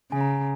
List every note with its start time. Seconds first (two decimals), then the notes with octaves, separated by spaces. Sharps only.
0.11 C#3 G#5
0.21 A#5
0.31 G#5